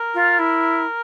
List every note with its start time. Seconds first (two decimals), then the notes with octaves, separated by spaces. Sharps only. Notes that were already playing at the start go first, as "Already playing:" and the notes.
Already playing: A#4
0.14 F4
0.39 E4